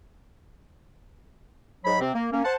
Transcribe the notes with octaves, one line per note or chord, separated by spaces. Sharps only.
G#2 F#3 B5
C3 C4
A#3
A#3 C#4
C5 F#5 A5